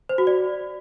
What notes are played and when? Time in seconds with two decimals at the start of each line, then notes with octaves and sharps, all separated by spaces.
0.09 C5
0.18 F#4
0.27 D5